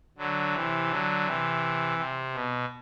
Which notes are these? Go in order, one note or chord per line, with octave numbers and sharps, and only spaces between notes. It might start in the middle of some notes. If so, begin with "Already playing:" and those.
D3 F#3
C3 E3
D3 F#3
C3 E3
C3
B2